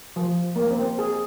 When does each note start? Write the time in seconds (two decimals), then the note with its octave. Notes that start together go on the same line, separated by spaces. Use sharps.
0.16 F3
0.56 A#3
0.71 C4
0.99 G#4